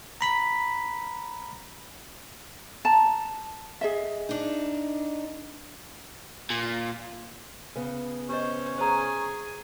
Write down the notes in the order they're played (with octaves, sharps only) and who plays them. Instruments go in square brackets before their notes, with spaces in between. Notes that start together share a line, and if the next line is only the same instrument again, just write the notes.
[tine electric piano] A#5 B5 B6
[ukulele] A5 A#5
G#4 D#5 E5
[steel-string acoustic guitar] D4 D#4
[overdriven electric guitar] A#2
[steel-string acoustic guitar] C#3 B3
[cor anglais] C#4 [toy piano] G4 D#5 [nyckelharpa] C5
[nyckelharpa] G#4 [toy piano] C5 A#5